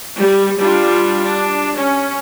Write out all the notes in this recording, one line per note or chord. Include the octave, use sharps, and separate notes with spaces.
G3
G3 D4 F4
D4
C#4